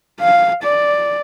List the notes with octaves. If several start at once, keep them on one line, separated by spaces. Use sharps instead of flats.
F5
D5